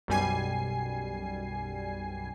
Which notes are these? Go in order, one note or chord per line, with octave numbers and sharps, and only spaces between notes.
B1 F#2 G3 G#5 C7